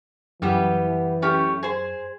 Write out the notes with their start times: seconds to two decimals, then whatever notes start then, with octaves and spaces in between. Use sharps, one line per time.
0.42 F#2 E3 G3 B3 G4
1.22 A3 C#4 G4
1.63 G#4 C5